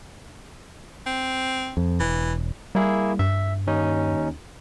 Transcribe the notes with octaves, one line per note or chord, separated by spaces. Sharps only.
C4
F2
E1 E3
G3 A#3 E4 G#4
G2 E5
D#2 C#4 D#4